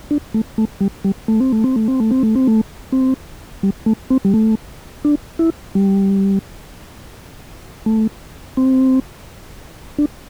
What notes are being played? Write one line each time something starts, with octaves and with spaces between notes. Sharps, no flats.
D4
A3
A3
G3
G3
A3
C4
A3
C4
A3
C4
A3
C4
A3
C4
A3
C4
G3
A3
C4
G3
A3
D4
E4
G3
A3
C4
D4